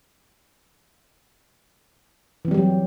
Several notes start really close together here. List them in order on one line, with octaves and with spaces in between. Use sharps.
E3 C4 G3 G4 F#3